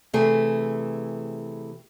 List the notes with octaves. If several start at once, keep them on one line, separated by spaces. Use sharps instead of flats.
C3 E3 A3 G#4